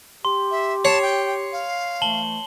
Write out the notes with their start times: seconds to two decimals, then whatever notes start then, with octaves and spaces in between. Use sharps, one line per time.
0.25 G4 C6
0.51 E5
0.85 C#5 A5 C7
1.02 G5
1.52 F5
2.02 E3 A3 A5 F#7 G7